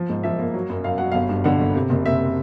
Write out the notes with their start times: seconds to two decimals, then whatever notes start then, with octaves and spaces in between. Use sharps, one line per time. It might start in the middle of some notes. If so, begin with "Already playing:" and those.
Already playing: F3
0.09 G#2
0.24 F3 E5
0.39 A#3
0.54 F#3
0.70 F#2
0.84 F#2 F5
0.98 F#3 F#5
1.12 G1 F5
1.29 G2
1.44 D3 F#5
1.60 G1
1.75 C3
1.90 F#1
2.05 C3 E5